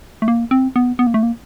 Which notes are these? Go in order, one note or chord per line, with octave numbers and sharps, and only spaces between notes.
A3
A#3
C4
B3
B3
A#3
A3
A#3